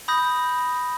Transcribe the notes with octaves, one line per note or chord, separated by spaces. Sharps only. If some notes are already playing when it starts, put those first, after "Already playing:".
B5 D#6 G6 A#6